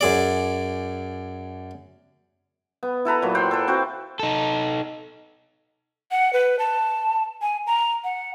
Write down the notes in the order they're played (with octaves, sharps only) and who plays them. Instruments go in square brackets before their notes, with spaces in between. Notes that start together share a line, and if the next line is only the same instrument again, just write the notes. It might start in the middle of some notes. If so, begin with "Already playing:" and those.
[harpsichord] F#2 G#4 D5
[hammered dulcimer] B3
E4 A4 B4 A#5
A#2 F#3
C5 F#5 G5 C6
A4 B4 C5
C4 F#4 C5
[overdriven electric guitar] D#4 A4
[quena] F#5
B4
A5
G#5
A#5
F#5